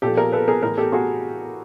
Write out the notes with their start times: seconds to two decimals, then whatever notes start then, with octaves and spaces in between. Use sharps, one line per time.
0.02 A#2 F3 G4 A4
0.17 G#4 A#4
0.32 A4 B4
0.48 G#4 A#4
0.63 A2 E3 G#4 A#4
0.77 G4 A4
0.92 F#4 G#4